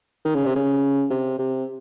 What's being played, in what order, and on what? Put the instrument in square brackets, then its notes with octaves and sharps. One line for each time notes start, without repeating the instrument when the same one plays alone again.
[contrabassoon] D#3
C#3
C3
C#3
C3
C3